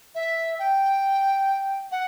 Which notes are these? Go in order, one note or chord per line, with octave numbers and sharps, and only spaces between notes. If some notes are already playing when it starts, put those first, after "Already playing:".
E5
G5
F#5